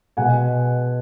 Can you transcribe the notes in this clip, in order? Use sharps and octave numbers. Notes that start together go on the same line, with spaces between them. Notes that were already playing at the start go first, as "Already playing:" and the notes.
B2 G#3 B3 F#5 G#5